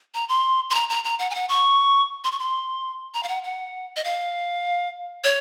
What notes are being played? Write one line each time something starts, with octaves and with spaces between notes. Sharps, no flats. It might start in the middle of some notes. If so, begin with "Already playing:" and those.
A#5
C6
C6
A#5
A#5
A#5
F#5
G#5
F#5
C#6
C6
C#6
C6
A#5
F5
F#5
F#5
D#5
F5
C#5